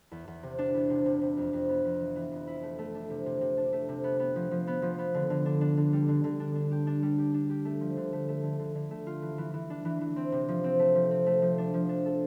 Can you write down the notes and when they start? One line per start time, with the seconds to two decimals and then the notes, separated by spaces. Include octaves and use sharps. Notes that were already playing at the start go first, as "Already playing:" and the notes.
0.11 E2
0.28 E2
0.43 C3
0.58 D4
0.74 E2
0.90 C3
1.06 C3
1.21 C3
1.37 F2
1.53 F2
1.69 B3
1.85 F2
2.00 E3
2.16 E3
2.31 F2
2.47 E4
2.63 A3
2.79 A3
2.95 D4
3.10 C3
3.26 C3
3.41 C3
3.57 D4
3.73 A3
3.89 C3
4.04 B3
4.19 B3
4.36 F3
4.51 F3
4.67 B3
4.82 F3
4.98 B3
5.14 D3
5.30 D3
5.46 D4
5.61 D4
5.77 D3
5.93 G3
6.08 D3
6.24 D3
6.40 D4
6.55 D4
6.71 G4
6.87 D4
7.02 G3
7.18 G4
7.34 D4
7.50 G4
7.65 A3
7.81 F3
7.97 D3
8.13 A3
8.28 A3
8.43 D3
8.59 D3
8.75 D3
8.91 A3
9.07 F4
9.22 E3
9.38 E3
9.54 E3
9.70 D4
9.85 E3
10.01 E3
10.16 C4
10.32 C3
10.48 F3
10.64 C4
10.79 A3
10.95 F3
11.11 C4
11.26 A3
11.42 F3
11.58 D4
11.74 F3
11.89 D4
12.05 A4